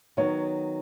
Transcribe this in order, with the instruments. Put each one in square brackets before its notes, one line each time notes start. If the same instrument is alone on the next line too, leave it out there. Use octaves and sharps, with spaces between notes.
[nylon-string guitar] D#3 F#3 B3 [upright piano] C#5